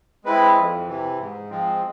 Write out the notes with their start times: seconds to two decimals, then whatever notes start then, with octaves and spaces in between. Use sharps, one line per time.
0.25 G#3 C4 E4 B4
0.56 F2
0.87 C3 E3
1.19 G#2
1.50 F3 G#3 C4